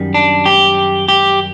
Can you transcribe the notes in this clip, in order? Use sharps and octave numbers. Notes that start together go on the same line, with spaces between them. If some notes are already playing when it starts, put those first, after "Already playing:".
Already playing: F#2 D#3 G3
D4
G4
G4